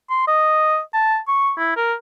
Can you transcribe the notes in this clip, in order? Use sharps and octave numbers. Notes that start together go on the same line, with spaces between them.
C6
D#5
A5
C#6
E4
A#4